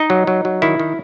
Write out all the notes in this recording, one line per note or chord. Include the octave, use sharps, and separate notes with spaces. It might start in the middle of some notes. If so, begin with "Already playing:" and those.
Already playing: D#4 D#5
F#3
F#3
F#3
D#3 E4
D#3